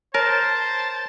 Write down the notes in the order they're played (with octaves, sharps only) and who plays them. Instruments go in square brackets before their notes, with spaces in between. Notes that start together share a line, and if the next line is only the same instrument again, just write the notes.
[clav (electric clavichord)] A#4 [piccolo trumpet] C5 [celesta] C#5 [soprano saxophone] A5